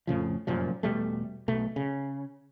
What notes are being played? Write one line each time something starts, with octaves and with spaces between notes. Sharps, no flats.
F2 A2 C#3 F3
F1 F#2 A#2 F3
E1 B2 G3 A3
B1 B2 A3
C#3